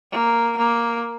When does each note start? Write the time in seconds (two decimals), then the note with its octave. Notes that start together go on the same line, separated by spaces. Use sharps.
0.12 A#3
0.58 A#3